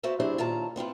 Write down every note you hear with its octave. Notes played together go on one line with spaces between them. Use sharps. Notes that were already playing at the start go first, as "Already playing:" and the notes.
B3 F#4 C5 D5 E5 F5
F#3 D4 E4 G4 G#4 C5
A#2 D#3 F4 C#5 A5 A#5
B3 C4 E4 F4